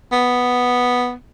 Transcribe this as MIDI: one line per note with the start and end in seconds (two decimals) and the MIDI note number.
0.12 1.14 59